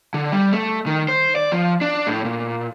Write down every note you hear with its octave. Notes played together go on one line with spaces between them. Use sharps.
D3
G3
A3
D#3
C5
D5
F3
D4
A2
A#2